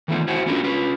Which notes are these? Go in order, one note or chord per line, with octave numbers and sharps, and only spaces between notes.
D#3 E3 A3 B3 D#4 F4
E4 F#4 C5 F#5 G#5
B3 C#4 D4 F4 F#4 A#4
C#4 F4 B4